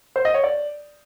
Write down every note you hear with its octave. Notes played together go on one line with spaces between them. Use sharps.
C5
D#5
C#5
D5